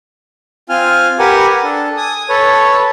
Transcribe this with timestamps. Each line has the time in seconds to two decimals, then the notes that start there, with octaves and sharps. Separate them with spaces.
0.69 C4 F4 G#5 F6
1.19 G4 A#4 B4 F#5 G#5
1.64 D4 A4
1.97 G#5 D#6
2.29 A4 B4 C#5